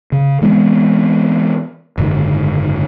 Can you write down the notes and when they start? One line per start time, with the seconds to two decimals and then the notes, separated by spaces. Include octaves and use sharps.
0.12 C#3
0.42 E3 G#3 B3 C4
1.98 F#1 G#2 D3 D#3